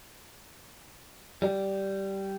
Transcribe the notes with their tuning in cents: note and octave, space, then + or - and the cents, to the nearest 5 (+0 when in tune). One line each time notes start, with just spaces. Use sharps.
G3 -10